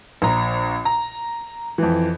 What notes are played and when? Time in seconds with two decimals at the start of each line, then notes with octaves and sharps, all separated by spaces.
0.22 A#1 A#5
0.85 A#5
1.78 F2 E3